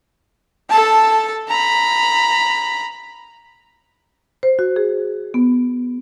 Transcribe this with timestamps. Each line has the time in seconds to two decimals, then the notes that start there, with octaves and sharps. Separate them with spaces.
0.70 A4 A5
1.49 A#5 B5
4.43 C5
4.59 F#4
4.76 G#4
5.34 B3